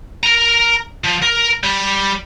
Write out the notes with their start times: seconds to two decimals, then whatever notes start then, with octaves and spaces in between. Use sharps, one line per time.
0.23 A#4 A#5
1.04 F3
1.22 A#4
1.64 G3